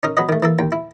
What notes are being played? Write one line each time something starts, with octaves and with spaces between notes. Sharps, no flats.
C#4 D#4 A#4
F#3 B3 B4 D#5
D#3 A3
E3 A#3 A4
D#2 G5
E4